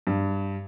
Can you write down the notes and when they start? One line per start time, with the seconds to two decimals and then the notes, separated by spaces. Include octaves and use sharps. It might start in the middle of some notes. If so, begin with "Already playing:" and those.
0.07 G2